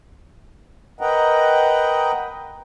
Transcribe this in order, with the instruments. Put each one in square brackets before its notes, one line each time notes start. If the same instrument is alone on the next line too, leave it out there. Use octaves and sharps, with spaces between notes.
[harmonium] A#4 B4 D#5 F#5 G5 A#5